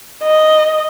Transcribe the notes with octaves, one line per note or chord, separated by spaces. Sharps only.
D#5